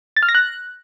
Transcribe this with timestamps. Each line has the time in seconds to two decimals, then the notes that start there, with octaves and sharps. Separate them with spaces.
0.17 A6
0.23 F6
0.29 A#6
0.35 F#6